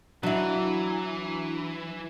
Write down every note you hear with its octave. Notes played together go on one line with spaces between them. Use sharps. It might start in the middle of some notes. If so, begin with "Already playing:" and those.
E3 F#3 D4 E4